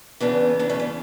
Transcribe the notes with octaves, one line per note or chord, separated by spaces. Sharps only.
E2 C#3 E3 B3 D4
B3 D4
A3 C#4
B3